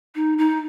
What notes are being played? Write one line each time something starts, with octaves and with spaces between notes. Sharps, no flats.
D#4
D#4